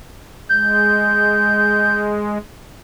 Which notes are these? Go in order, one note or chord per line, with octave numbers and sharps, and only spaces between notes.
G#3 G6